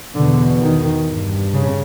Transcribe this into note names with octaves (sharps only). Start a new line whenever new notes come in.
E2 B2 D3
D#3
G2
C#3